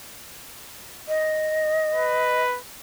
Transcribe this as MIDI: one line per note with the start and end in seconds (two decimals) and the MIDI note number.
1.08 2.42 75
1.94 2.58 71